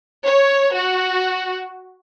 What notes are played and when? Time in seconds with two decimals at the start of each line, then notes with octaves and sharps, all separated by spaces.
0.25 C#5
0.72 F#4